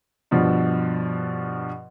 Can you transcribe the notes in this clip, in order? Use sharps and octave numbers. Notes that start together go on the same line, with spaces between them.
G2 B2 F3